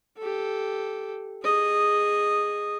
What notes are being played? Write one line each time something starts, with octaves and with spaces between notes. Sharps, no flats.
G4 A4
G#4 D#5